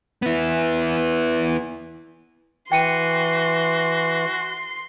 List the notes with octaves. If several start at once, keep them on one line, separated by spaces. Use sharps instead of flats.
B3 E4
E3 F#4 G5 C6 C#7 D#7